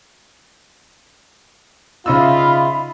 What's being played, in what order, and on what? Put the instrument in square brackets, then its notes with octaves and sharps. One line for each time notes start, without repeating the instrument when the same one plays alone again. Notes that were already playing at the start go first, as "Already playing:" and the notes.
[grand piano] C#3 D#4 E6 [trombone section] F4 [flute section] E5 B5